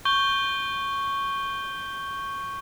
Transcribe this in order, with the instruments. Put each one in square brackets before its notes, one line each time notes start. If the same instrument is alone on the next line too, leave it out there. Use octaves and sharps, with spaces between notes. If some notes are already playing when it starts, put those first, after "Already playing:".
[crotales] C#6 G6 G7